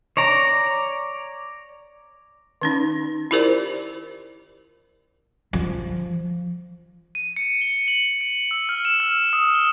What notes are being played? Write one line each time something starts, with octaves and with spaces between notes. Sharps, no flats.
C#5 D5 A#5
D#3 C#4 D#4
E4 F4 G4 A#4 C5 D5
F3
D#7
C#7
G7
F#7
D7
E6
F6
E7
E6
D#6
G7